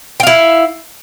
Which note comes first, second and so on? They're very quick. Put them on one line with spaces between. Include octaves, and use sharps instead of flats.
G5 F5 E4